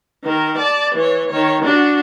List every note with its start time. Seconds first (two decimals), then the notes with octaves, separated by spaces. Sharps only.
0.24 D#3 A#4
0.58 D5 A5
0.95 E3 C#5
1.30 D#3 C#5
1.64 D4 F#4